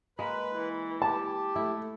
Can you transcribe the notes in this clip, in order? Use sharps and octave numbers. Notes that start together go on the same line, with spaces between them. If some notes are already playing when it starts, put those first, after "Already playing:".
G#3 A#3 B4 B5
E3
G4 A5
A3 E4